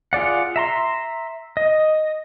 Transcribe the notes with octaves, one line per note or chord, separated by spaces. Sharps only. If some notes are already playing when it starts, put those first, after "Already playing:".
F4 G#4 D5 F#5
E5 A#5 C6
D#5